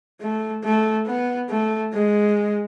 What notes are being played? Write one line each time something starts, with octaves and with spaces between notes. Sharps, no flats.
A3
A3
B3
A3
G#3